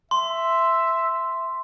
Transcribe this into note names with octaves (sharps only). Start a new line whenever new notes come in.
E5 C6